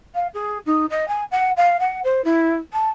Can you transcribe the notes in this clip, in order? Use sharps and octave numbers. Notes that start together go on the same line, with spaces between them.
F5
G#4
D#4
D#5
G#5
F#5
F5
F#5
C5
E4
A5